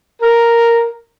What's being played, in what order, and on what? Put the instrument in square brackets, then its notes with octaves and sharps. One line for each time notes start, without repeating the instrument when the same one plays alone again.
[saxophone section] A#4